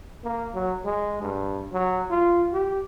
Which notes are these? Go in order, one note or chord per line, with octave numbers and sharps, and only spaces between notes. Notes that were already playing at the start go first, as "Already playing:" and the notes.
A#3
F#3
G#3
G2
F#3
F4
G4